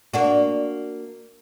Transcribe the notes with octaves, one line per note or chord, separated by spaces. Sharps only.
A#3 D4 F#4